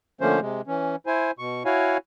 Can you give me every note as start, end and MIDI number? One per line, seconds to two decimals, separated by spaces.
0.21 0.40 50
0.21 0.40 53
0.21 0.40 57
0.21 0.40 58
0.21 0.40 61
0.21 0.40 72
0.41 0.61 48
0.41 0.61 56
0.67 0.96 52
0.67 0.96 61
1.06 1.31 64
1.06 1.31 72
1.06 1.31 80
1.39 1.63 47
1.39 1.63 85
1.65 1.97 64
1.65 1.97 66
1.65 1.97 73
1.65 1.97 77
1.65 1.97 80